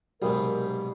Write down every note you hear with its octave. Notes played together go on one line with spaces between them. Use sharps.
B1 G#2 C3 G3 G#4 A#4